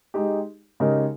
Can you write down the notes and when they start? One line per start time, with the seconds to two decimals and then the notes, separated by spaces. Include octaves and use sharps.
0.14 G#3 D#4 G4
0.80 C#3 G#3 D#4 G4 A#4